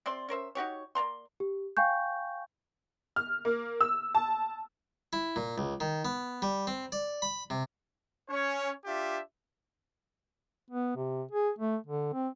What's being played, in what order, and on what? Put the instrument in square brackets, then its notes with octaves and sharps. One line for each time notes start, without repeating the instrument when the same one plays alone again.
[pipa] C3 C4 D5 C6
C#4 A#4 C5 E5
D#4 F#4 G4 C#5
A#3 D5 A#5 C6
[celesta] G4
F5 G5 G#5 C#6 G6
[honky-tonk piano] F6
A#3
E6
A5
[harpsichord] E4
A#2
C#2
D#3
B3
G3
C4
D5
B5
C3
[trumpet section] C#4 C#5
D4 F4 G4 E5
[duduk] B3
C3
G#4
A3
D3
C4